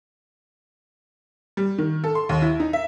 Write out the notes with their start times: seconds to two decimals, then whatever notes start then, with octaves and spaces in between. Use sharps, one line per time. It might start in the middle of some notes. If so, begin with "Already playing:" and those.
1.57 G3
1.78 D#3
2.04 A4
2.15 C6
2.29 D#2
2.42 E4
2.60 D#4
2.73 E5